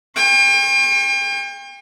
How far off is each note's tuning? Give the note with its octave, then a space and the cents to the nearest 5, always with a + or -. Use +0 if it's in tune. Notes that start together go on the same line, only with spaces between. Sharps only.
G5 +35 C#6 -45